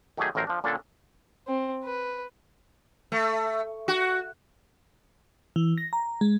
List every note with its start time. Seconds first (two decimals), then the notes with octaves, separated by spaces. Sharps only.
0.17 D#3 F#3 A3 G4 G#4
0.35 A1 A2 F#3 A#4 C5
0.47 F3 D4
0.64 A#2 D3 C#4 D4 A4
1.48 C4
1.84 B4
3.12 A3
3.88 F#4
5.56 E3
5.78 A#6
5.93 A#5
6.21 G#3